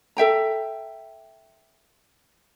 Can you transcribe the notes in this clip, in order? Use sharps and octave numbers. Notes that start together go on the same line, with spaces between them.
A4 E5 G5 A#5